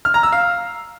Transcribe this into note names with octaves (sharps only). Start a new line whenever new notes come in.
F6
A#5
E6
F5